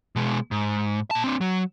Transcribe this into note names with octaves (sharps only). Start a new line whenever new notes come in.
B2 G#3
G#2
A#2 A5
C4 D4
F#3